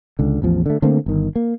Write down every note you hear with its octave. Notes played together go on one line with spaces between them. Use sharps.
C#2 D3
A1 E2 F3
D3 A3
D3 A3 A#3 C4
G1 D#3
A#3